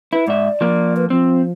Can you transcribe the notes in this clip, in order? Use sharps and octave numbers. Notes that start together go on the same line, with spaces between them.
E4 B4
G#2 D5 E5
F3 A#3
B4
F3 C4